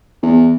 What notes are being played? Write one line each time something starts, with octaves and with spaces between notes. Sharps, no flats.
E2